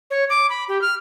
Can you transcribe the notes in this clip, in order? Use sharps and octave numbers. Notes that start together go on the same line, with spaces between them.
C#5
D6
B5
G4
F6